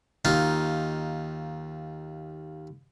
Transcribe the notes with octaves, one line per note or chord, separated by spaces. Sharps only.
D#2 D#4 F4